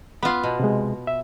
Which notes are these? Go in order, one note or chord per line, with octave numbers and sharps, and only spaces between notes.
B3 F4 B5
B2
C3 G#3
E5